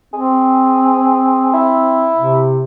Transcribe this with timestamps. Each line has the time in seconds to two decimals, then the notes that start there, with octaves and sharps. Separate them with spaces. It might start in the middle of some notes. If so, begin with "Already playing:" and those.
0.14 C4 G#4
1.54 E4
2.16 C3